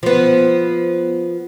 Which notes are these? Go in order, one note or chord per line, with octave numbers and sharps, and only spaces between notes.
F3 B3